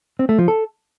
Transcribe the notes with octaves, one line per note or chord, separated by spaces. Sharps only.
C4
A3
F3
A4